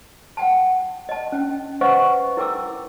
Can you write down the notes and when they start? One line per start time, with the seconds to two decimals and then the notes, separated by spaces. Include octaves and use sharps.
0.37 F#5 G5 A5
1.09 D#5 A5
1.32 C#4 G5
1.81 B4 C5 D#5 F5 F#5 C#6
2.37 E4 A#4 G5 D6 E6